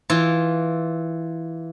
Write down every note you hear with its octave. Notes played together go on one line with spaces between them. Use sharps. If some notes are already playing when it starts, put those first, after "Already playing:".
E3 F4